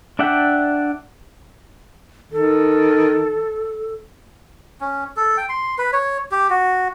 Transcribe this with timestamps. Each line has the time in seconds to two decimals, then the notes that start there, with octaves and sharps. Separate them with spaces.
0.19 D4 D5 E5 F#5 G5
2.32 D#3 A4
4.81 C#4
5.17 A4
5.37 G5
5.49 C6
5.78 B4
5.93 C#5
6.32 G4
6.50 F#4